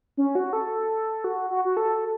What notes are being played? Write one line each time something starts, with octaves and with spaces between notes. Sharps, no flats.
C#4
F#4
A4
F#4
F#4
F#4
A4